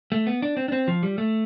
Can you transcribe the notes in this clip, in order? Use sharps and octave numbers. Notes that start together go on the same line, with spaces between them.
A3
B3
D4
C4
D4
C4
F3
G3
A3